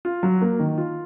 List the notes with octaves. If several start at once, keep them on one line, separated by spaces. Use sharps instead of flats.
F4
F#3
A#3
D#3
F4